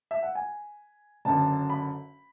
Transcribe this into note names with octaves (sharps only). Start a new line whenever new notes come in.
E5
F#5
G#5
F#1 F#2 D3 A5
B5